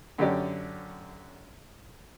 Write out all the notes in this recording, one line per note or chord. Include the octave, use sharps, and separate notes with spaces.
F#2 D3 C#4 G4 D5